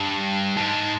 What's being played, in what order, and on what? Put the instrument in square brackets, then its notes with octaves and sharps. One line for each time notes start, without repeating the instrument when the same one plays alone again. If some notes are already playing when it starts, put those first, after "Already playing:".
Already playing: [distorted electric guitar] G2 [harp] A5
[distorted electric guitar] G#2 [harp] A5